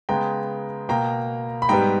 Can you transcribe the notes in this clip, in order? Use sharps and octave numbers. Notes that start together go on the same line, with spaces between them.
C#3 G#3 B3 G5 A#5
B2 A#3 G5 A#5
B5
G#2 G3 B3 G5 A#5